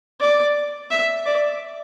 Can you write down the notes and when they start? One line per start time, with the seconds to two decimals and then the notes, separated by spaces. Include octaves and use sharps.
0.21 D5
0.91 E5
1.26 D5